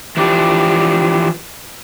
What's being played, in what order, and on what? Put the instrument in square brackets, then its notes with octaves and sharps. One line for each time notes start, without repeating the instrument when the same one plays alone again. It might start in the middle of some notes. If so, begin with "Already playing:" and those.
[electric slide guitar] E3 F3 D4 G4